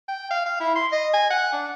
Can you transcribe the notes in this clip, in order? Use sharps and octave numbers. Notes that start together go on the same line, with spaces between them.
G5
F5
F5
E4
C6
D#5
G#5
F#5
D4